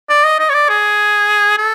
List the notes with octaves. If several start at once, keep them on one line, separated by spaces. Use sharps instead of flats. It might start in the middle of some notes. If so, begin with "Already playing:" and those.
D5
D#5
D#5
C#5
D5
G#4
A4